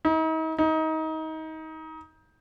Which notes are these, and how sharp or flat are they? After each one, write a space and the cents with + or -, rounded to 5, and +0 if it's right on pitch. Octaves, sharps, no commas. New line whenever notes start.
D#4 +40
D#4 +25